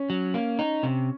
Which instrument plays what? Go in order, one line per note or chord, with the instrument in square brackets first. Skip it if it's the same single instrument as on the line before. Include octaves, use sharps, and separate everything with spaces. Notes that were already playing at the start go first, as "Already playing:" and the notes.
Already playing: [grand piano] C#4
[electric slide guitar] F#3
A#3
D#4
C3